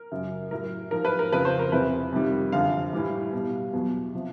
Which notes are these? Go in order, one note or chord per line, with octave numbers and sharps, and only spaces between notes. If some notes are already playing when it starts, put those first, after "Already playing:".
Already playing: A#4
F#2 C#3 F#3
A2 F#3 A#4
G#2 F3 A#4
B4
A#4
F2 C#3 F3 B4
C5
A#4
F2 C3 E3 B4
F2 C3 D#3 G3
F#2 D3 F3 F5
A2 E3 G3
B2 G3
E2 B2 F#3
C3 F3